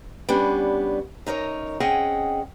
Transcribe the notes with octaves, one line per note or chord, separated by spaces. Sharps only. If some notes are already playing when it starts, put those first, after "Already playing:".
G3 B3 C#4 D4
F#2 D#4 A#4 C#5
C4 C#4 G#4 D#5 F#5 G5